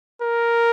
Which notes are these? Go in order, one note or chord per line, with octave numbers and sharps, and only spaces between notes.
A#4